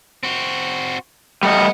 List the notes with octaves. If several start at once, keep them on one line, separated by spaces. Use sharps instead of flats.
C4 F#4
G3 A3 B3 D#5 F#5